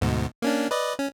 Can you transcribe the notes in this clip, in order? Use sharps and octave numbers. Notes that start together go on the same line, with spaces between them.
D2 G#2 B2
A#3 C#4 D4
B4 D5 D#5
C#4